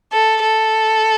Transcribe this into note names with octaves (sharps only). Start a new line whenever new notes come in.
A4
A4